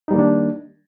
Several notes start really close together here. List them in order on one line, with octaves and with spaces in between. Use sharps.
D#4 G3 A#3 D#3 D4